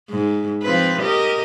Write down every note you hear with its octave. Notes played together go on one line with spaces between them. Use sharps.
G#2
F3 C4 B4
G4 A#4 D#5